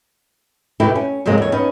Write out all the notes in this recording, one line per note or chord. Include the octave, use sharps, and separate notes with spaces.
F#2 B2 D#3 A3 E4 G4
C#4
G2 C3 F#3 G#3 A#3
E2 C#5
B3 C#4 D#4 C#5